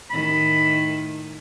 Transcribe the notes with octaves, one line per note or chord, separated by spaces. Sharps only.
A2 D#3 B5